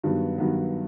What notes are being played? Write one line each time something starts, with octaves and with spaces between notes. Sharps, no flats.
G2 D#3 F#3 B3
G2 D#3 F#3 B3